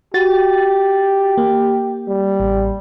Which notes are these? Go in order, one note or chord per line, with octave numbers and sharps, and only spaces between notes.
F#4 G4 A6
A#3
G3
A1